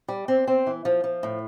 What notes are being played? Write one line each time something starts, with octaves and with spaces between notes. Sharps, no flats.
G3
C4
C4
E3
F3
F3
A2